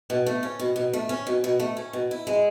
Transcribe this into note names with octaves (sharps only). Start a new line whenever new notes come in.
B2
A3
C#4
B2
B2
A3
C#4
B2
B2
A3
C#4
B2
E4
G#3